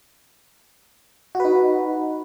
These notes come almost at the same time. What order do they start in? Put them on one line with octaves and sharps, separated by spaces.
F#4 B4 D#4